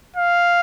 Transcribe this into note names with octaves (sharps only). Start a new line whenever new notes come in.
F5